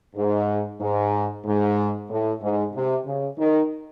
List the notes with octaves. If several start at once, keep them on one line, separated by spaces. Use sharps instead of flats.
G#2
G#2
G#2
A2
G#2
C3
C#3
D#3